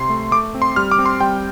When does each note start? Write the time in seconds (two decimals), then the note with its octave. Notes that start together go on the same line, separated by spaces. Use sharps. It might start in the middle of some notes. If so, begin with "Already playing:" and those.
Already playing: C3 C6
0.10 A3
0.31 A3 D6
0.55 C4
0.62 C6
0.76 G3 F6
0.91 D6
0.99 C4
1.06 C6
1.20 G3 G5